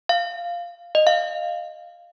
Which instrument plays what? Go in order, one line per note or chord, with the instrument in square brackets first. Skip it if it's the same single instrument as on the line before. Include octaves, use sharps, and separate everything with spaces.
[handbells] F5
D#5
F5